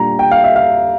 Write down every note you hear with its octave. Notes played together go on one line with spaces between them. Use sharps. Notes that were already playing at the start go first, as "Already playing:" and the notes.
Already playing: A#2 G3 D4 F4 A#5
G5
F5
E5
F5